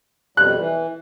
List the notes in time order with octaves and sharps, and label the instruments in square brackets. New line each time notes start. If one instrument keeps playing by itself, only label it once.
[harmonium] F2 B2 G3 [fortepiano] F#6
[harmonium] E3